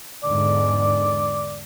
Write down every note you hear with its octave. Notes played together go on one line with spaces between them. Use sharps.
E2 G#2 D3 D5